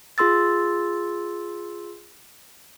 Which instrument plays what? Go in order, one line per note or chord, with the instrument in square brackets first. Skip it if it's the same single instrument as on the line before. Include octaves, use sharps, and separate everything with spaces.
[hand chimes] F4 G#4 C6 E6 A6